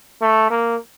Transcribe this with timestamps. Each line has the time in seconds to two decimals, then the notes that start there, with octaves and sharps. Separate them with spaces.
0.21 A3
0.50 A#3